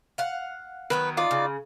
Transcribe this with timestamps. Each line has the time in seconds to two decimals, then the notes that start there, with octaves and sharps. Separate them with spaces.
0.18 F5 F#5
0.90 D#3 F#3 B3 B4
1.17 D#4 F4 D5
1.31 C#3